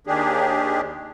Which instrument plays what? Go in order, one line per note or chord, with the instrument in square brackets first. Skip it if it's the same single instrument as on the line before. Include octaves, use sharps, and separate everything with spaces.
[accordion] D#2 D#3 D4 G4 G#4